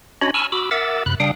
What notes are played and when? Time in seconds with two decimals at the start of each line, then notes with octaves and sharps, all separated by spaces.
0.21 C#4 D4 F#4 C#5 D#5 B5
0.34 G#5 A5 B5 C#6 E6 F6
0.52 F#4 B5 D6 E6
0.71 A#4 E5 F#5 D6 E6 A6
1.06 F#2 C3 B5 F#6
1.20 C#3 G3 D4 F5 G5 D#6